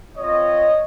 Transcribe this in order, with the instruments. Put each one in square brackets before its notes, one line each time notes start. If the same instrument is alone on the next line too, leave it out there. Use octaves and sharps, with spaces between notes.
[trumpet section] C4 F4 C#5 D#5